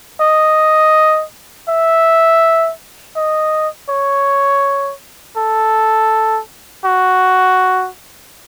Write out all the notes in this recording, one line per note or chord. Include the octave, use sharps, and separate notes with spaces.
D#5
E5
D#5
C#5
A4
F#4